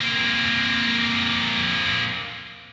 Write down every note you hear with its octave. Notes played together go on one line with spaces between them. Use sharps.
A#3 C4